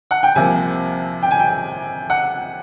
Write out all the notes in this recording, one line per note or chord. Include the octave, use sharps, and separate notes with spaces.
F#5
G5
C2 C3 F3 A#3 G#5
G5
G#5
G5
F#5